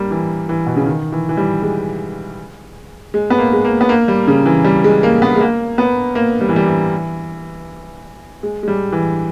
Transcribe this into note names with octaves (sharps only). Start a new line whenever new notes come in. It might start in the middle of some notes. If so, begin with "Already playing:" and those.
Already playing: G3 A#3
E3
E3
B2
C#3
D#3
E3
E3
G3
G#3
G#3
B3
A#3
G#3
A#3
B3
A#3
G3
C#3
E3
G3
G#3
A#3
B3
G#3
A#3
B3
A#3
G3
E3
G3
E3
G#3
G#3
G3
E3